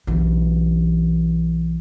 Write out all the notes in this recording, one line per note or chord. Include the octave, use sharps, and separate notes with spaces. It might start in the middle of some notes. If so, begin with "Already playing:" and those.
B1 E3